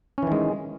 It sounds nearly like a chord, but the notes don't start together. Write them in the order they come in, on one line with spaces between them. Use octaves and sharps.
C#4 E3 D#3 G#3